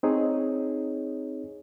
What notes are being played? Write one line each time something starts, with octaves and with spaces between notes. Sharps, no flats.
C4 D#4 G#4 C#5